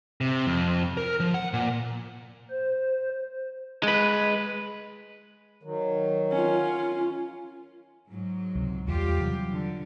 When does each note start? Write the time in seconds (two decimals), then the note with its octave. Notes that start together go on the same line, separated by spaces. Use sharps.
0.21 C3
0.47 F2
0.97 A#4
1.20 F3
1.34 F#5
1.53 A#2
2.50 C5
3.83 G#3 B4
5.63 D#3 F#3
6.32 C#4 F4
8.08 G#2 F#3
8.55 C#2 C3
8.88 E2 G3 F4 G4
9.20 C3 E3 F#3
9.51 D3